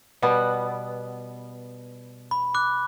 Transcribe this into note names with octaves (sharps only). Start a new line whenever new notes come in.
B2 G3 B3
B5
D6 F#6